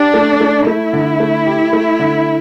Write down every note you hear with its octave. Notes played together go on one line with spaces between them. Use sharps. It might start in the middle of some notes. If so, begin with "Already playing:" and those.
Already playing: D4 G4
A3
A3
A3 E4
D3
A3
G4
A3
D3